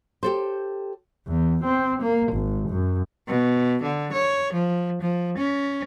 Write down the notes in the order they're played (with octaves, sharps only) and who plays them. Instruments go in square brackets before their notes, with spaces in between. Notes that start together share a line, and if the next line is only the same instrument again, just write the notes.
[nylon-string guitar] G4 A4 C5
[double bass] E2
C4
A#3
G#1
F#2
[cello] B2
D3
C#5
F3
F3
C#4